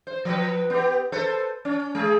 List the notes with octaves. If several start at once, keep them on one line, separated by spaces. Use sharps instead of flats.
C5
F3 B4
B3 G4
A4 B4 C5
C#4
G#3 G#4